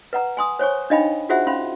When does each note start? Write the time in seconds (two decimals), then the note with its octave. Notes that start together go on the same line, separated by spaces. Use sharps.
0.13 B4 F#5 A#5
0.37 G#5 C6 D#6
0.59 C5 C#5 G#5 C#6
0.90 D4 D#4 D#5 F5 G5 B5
1.29 F4 F#4 G#4 C5 E5 F#5
1.47 C#4 F5 B5 C6